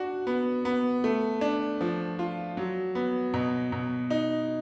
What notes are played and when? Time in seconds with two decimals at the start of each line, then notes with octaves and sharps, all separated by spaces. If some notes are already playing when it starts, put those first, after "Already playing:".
Already playing: D4 F#4
0.27 B3
0.65 B3
1.04 A3
1.41 D4
1.81 F3
2.19 F4
2.57 F#3
2.95 B3
3.34 B2
3.72 B2
4.10 D#4